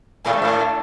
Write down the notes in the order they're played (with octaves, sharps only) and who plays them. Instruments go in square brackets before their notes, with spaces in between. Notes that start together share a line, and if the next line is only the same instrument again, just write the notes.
[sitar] A2 [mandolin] A3 D4 A4
[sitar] G#2
A2